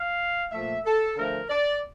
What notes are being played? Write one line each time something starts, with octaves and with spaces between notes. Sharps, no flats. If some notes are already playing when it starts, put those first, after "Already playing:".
Already playing: F5
A#2 F3 A3 E5
A4
D3 F3 A3 A#4
D5